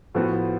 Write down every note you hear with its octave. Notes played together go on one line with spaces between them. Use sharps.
A2 F3 B3 F#4